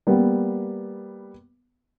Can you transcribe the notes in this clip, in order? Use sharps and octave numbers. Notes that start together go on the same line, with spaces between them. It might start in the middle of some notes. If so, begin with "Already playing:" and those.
G3 A#3 B3